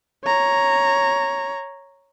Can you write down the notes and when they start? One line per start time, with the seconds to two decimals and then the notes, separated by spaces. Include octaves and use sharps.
0.24 C#5 A#5